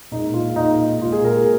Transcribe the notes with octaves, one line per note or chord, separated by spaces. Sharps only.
A#2 G#3 D#4
F4
A#2 G#3 D#4
A#2 G#3 F4
G#4
A#4
G#4